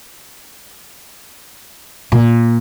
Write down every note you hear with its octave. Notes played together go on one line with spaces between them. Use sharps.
A#2